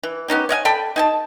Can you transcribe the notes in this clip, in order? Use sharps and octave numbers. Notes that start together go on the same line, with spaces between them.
E3
B3 C#4 D#4 G4
C#5 D#5 F5 G#5
A4 D5 G5 B5
D#4 G#5 A5